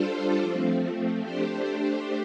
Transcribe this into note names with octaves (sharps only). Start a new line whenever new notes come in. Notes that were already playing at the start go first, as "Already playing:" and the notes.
Already playing: G3 D4 F4 A4 C5
F3 A3 C4
A3 D4 G4 C5